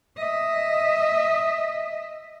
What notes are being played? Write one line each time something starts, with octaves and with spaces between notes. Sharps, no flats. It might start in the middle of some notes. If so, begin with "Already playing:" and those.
D#5 E5